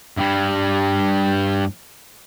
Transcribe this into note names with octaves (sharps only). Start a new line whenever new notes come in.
G2 G3